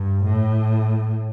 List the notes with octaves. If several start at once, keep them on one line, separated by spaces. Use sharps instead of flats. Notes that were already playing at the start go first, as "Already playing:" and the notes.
Already playing: G2
A2